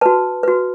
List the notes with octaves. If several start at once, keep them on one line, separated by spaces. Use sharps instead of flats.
F#4 B4 A5
F#4 B4